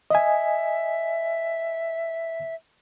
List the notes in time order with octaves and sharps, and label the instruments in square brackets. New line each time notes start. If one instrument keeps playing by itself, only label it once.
[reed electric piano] D#5 G#5 [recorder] E5